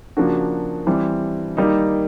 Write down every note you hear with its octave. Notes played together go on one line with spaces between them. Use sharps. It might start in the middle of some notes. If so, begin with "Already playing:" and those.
C#3 F3 A#3 D4 F#4
E3 G3 C4
D#3 G3 A#3 D#4